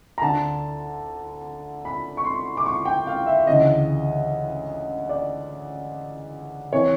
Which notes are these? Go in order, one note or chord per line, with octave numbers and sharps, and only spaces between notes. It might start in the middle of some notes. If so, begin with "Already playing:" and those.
A#5
D2 D3 A5
B5
C#6
C6
D6
C#6
G5
F5
E5
D2 C#3 E3 D#5
D5
C3 E3 C#5